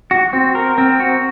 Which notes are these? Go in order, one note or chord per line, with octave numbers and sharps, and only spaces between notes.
F#4
C4
A#4
C4
F#4